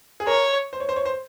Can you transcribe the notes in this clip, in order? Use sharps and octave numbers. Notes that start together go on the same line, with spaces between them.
G#4
A#4 C#5
C5
C#5
C5
C#5
C5